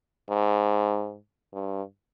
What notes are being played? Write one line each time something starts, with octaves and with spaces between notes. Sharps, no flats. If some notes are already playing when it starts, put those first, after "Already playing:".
G#2
G2